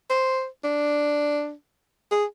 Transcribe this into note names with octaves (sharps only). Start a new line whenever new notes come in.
C5
D4
G#4